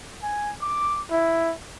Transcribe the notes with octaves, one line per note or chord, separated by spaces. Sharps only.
G#5
D6
E4